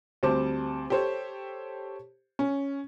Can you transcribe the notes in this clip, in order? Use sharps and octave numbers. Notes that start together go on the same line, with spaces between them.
D2 G3 C4 C5 A5 D6
G4 A4 C5 C#5
C#4